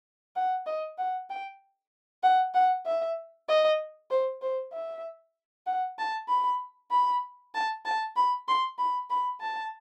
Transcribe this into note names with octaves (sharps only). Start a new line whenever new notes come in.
F#5
D#5
F#5
G5
F#5
F#5
E5
D#5
C5
C5
E5
F#5
A5
B5
B5
A5
A5
B5
C6
B5
B5
A5